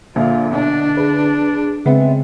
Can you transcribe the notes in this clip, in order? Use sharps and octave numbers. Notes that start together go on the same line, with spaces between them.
A#1 A#2 D3 F4 E5
B2 D4
G#4 B4
C#3 G#3 B3 C4 E5